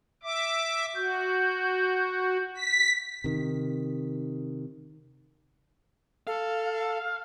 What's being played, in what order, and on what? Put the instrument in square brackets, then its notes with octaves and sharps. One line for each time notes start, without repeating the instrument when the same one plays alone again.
[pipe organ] E5 D6
[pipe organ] F#4 [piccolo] G6
[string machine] B6
[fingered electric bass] C3 D#3
[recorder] A4 [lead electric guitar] F5